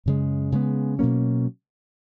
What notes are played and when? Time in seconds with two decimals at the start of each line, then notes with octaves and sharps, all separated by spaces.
0.06 F#2 C#3 G#3
0.52 C#3 G#3 B3
0.99 B2 F#3 A#3 C#4